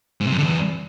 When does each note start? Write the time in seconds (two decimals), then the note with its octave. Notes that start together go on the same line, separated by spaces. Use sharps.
0.21 G#2
0.26 C3
0.32 F#2
0.37 D3
0.43 E2